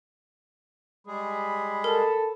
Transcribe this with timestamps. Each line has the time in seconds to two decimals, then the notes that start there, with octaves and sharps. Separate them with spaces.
1.07 G3 G#3 G#4 B5
1.84 A4 A#4